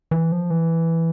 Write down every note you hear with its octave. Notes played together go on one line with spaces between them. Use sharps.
E3
F3
E3